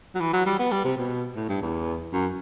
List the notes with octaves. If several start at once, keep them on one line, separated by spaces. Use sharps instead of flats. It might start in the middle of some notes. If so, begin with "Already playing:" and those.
F#3
E3
F#3
G3
B3
G3
C3
B2
A2
G2
E2
F#2